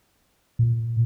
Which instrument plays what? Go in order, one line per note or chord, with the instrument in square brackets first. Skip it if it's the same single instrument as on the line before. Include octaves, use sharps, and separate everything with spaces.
[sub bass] A#2